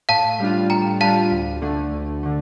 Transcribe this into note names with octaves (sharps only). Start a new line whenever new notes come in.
A2 F5 A5
G3 D4 F4
A2 G5 A#5
G3 D4 F4 F5 A5
D2
D3 A3
D2
D3 A3